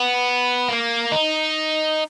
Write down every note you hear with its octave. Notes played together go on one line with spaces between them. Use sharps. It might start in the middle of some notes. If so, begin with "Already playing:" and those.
Already playing: B3
A#3
D#4